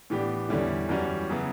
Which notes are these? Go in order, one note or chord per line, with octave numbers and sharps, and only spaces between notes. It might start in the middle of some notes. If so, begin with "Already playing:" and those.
A2 E3 B3 D4 G4
E2 D3 G3 C#4 E4
F#2 E3 G3 C#4 F#4
C#3 F#3 B3 E4